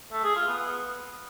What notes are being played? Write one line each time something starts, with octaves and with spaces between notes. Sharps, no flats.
A3
G#4
F4
B3